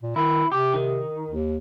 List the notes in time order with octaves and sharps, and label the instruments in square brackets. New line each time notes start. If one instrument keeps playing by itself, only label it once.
[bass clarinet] A#2
[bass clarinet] D#3 [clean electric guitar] E4
[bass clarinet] C3 [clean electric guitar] G4
[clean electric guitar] D#3
[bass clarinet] D#2